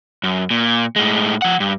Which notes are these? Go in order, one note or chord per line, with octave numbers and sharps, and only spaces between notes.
F#2
A#2
A2 G#3
F3 F#5
G2